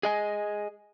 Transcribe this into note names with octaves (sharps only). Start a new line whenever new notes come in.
G#4 D#5 G#5